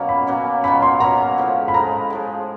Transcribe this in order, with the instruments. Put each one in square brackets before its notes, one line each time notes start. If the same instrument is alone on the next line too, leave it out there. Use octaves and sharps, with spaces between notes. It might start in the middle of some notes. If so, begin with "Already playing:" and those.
Already playing: [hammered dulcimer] B2 F#3 A#3 C#4
[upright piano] B5
[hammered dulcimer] B2 F#3 A#3 C#4
[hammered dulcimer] B2 F#3 A#3 C#4 [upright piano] B5
[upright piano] C6
[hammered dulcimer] B2 F#3 A#3 C#4 [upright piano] A#5
[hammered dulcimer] A2 F3 G#3
[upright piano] B5
[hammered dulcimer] A2 F3 G#3 [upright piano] A#5
[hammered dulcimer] A2 F3 G#3